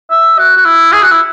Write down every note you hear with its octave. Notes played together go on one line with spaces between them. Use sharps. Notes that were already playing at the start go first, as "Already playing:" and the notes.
E5
F#4
F#4
E4
G#4
F#4
E4